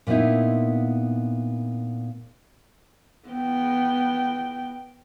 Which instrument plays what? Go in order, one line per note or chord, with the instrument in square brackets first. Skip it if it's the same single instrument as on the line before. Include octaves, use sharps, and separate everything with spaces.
[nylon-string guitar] A#2 B3 C4 D#4 E4
[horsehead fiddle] B3 G5